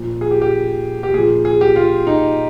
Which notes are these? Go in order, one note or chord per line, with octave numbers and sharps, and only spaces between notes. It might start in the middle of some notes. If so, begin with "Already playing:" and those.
Already playing: A#2 F3
G#4
G4
G4
G4
A#2 G#4
F3
G#4
G4
F4
D#4